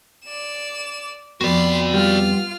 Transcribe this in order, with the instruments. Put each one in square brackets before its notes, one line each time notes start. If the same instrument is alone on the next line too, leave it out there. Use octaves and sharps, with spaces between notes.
[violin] D5 E7
[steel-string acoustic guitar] F2 B3 [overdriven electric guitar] F#4 D5 [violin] B5 C6
[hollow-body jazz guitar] G3 [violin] F4 F6